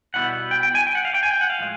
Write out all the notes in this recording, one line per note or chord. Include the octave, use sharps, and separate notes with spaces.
B2 G3 B3 E4 F#5
G5
G5
G#5
G5
F#5
F5
G5
G#5
G5
F#5
F5
A2 F3 G#3